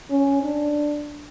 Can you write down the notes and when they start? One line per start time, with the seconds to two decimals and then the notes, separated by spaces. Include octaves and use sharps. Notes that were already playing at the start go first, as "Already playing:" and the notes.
0.11 C#4
0.43 D4